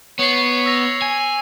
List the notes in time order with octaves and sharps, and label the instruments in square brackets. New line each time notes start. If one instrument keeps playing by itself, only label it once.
[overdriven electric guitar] B3 [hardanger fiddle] C#5 [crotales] C7 C#7 F#7
[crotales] E6 A#6 F7
[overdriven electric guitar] G#5